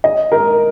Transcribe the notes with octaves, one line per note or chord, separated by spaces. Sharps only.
D#5
A#4